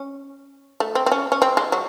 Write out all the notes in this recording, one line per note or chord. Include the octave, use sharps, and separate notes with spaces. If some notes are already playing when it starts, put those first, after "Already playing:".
Already playing: C#4
A3
C4
C4
C#4
C#4
C4
G#3
F#3